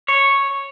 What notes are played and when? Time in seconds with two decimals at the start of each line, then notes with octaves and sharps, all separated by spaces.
0.08 C#5